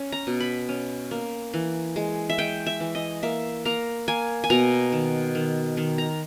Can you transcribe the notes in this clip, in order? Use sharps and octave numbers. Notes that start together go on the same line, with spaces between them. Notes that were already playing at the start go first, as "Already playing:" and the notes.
Already playing: C#4
A#5
B2
B5
C#4
A#3
E3
G#3
E5
G#3 G5
E5
E3
D#5
A#3 E5
A#3 A#5
A#3 G#5
G#5
B2 A#5
D#3
D#3
D#3
A#5